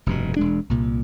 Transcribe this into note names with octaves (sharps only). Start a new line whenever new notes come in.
F1 G2 B2
E1 G#3 D4
C2 A#2